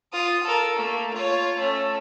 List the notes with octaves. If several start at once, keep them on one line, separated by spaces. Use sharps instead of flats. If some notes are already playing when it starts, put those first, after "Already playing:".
F4 D#6
A4 A#4
A3 A#3
F4 C#5
A3 C#4